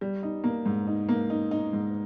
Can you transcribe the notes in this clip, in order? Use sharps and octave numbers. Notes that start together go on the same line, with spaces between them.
G3
D#4
A#3
G#2
D#4
A#3
D#4
D#4
G#2